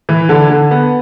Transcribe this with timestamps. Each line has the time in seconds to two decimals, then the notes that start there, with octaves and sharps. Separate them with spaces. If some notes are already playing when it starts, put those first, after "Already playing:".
0.09 E3
0.29 D3
0.50 D3
0.71 B3